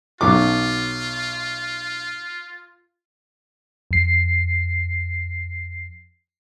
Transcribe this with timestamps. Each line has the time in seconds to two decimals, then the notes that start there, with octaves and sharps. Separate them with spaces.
0.21 B1 F#3 F4 D6
3.91 F2 C7